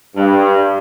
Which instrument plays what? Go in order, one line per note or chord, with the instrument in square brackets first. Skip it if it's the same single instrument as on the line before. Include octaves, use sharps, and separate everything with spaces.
[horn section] G2